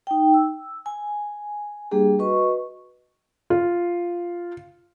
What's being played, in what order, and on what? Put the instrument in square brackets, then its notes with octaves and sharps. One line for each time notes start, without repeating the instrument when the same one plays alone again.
[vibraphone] D#4 G5
E6
G#5
G3 A#3 D4 G4 G#4
F#4 B4 D#5 C#6
[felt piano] F4